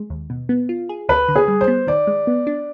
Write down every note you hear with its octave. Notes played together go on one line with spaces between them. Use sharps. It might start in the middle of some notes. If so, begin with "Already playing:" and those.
Already playing: G#3
D#2
B2
B3
F4
G#4
D2 B4
D3
G#4
G3
C5
B3
D#3 D5
G#3
B3
D4